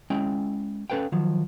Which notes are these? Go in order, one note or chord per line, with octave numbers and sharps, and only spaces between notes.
G#3 C#4 E4 G5
C#4 A4 B4 F5 G5
D#3 F3 F#3